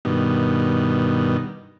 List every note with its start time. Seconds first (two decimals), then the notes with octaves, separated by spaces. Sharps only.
0.05 G2 B2 D#3